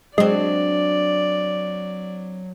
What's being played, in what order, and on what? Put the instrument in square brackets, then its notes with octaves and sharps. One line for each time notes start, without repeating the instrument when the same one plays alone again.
[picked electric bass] F#3 [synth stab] G#3 [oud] C4 D4 [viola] D5